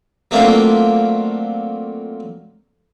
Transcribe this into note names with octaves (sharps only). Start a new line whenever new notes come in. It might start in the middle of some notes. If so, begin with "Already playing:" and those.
F#3 A3 A#3 C4 D4 F4